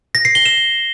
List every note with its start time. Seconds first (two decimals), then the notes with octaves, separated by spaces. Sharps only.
0.15 A#6
0.25 C7
0.35 G7
0.46 E7